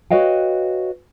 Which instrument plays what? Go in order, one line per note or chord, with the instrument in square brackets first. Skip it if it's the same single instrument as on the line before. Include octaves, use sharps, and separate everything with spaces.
[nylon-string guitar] F#4 B4 C#5 D#5 F5 G5